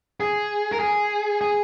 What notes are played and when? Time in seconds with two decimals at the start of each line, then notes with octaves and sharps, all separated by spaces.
0.20 G#4
0.72 A#4
0.80 G#4
1.41 G#4